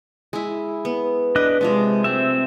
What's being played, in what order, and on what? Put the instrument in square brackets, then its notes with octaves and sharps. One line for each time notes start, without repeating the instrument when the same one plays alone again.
[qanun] G#3 E4
B3
[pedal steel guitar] D4 D#5 F#6 [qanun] B4
[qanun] C3 F3 D4 [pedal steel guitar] G#3
[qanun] A3 [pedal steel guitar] C4 E5